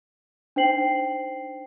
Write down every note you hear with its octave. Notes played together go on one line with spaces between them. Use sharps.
D4 D#4 C5 G5 C7 F#7